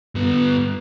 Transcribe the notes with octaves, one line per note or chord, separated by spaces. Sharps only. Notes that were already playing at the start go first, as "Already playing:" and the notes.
G2 B3